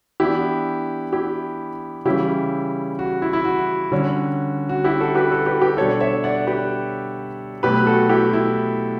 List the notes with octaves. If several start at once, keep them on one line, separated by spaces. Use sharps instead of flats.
E3 B3 D4 E4 G4
E4 G4
C#3 E3 G3 C#4 E4 G4
F#4
E4
E4
F#4
D3 G3 C#4
F#4
E4 G4
F#4 A4
G4 B4
F#4 A4
G4 B4
G4 B4
B2 G3 D4 A4 C#5
C#5 E5
D5 F#5
G4 B4
B2 F#3 A3 G4 B4
F#4 A4
E4 G4
E4